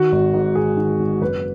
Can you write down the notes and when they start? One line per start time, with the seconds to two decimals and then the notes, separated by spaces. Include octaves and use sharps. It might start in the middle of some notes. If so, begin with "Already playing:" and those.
Already playing: D#3 F#4
0.12 G#1
0.34 G#2
0.55 G#1 G#4
0.77 D#3
0.99 G#1
1.21 F#1 B4